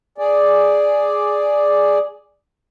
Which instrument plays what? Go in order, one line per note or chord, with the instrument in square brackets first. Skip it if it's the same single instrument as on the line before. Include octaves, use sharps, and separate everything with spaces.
[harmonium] G#4 D5